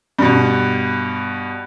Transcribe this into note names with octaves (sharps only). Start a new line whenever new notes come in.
G2 B2